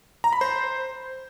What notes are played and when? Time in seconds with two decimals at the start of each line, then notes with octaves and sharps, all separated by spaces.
0.24 A#5
0.33 B5
0.41 C5